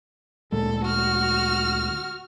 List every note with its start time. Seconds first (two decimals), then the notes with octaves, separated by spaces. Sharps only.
0.52 D2 A#2 G#3 A4
0.84 F#4 F6